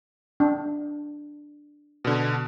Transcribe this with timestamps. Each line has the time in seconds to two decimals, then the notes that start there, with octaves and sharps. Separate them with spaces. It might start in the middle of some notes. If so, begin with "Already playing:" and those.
0.40 D4
2.05 B2 D3